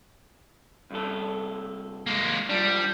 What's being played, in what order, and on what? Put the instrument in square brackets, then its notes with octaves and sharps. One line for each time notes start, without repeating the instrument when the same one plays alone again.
[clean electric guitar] C2 G2 A4
[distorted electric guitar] G#3 A#3
[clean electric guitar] F3 D4 [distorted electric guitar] G3